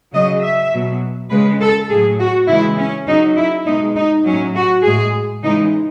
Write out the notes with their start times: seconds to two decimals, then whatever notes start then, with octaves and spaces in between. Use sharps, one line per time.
0.13 C#3 F#3 D#5
0.42 E5
0.72 B2 F#3
1.30 C#3 G#3 B4
1.60 A4
1.90 A2 F#3 G#4
2.19 F#4
2.48 C#3 E3 G#3 E4
2.78 C#4
3.07 C#3 F#3 D#4
3.37 E4
3.66 B2 G#3 D#4
3.96 D#4
4.25 F#3 C#4
4.30 A2
4.55 F#4
4.84 A2 G#3 G#4
5.43 C#3 E3 G#3 D#4